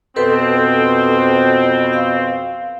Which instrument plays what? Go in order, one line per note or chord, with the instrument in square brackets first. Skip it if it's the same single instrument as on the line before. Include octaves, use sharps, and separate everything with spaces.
[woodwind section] F2 B2 C4 [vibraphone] A4 B4
[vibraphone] F5